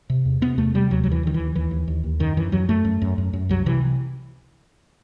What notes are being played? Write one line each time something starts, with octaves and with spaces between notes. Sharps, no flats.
C3
E2
C3 B3
E2 A3
C3 G3
D#2 F#3
D#2 F#3
E3
D#2 D#3
E3
D#2
D#2 E3
D#2
D#2
D#2
F#2 D#3
F#2 E3
F#2 F#3
F#2 A3
F#2
F#2
F#2
F#2
C2 F#3
C3 E3